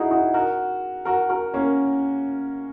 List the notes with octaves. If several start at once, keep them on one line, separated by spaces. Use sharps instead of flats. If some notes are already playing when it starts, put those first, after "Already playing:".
Already playing: D#4 E4 F#4 G#4
D#4 F#4
F#4 A#4
F#4 A#4
F#4 A#4
A#3 C#4